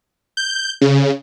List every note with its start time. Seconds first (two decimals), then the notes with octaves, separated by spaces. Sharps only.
0.37 G6
0.81 C#3